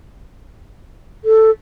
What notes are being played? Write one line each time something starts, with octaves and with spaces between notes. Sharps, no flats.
A4